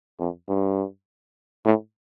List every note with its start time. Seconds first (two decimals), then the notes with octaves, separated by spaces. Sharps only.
0.20 F2
0.49 G2
1.65 A2